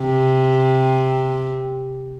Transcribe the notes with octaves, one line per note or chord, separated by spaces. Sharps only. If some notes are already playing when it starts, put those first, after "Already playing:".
Already playing: C3